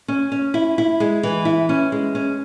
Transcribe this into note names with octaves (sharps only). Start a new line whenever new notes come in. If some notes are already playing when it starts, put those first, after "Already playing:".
C#4
C#4
E4
E4
G#3
E3
E4
C#4
G#3
C#4